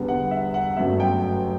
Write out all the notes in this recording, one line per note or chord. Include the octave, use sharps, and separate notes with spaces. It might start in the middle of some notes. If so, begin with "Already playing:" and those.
Already playing: E2 D3 G3 B3
F#5
E5
F#5
G1 F#2 F#3 A3 E5
G5